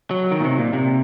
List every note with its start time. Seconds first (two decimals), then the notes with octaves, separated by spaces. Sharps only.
0.11 F#3
0.31 D#3
0.40 A#2
0.45 C3
0.59 A#2
0.73 C3